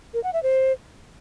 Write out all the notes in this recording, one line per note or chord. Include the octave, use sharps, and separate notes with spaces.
A#4
F#5
E5
C5